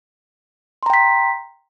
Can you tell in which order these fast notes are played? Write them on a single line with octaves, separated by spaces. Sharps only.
C6 A#5 G5 B6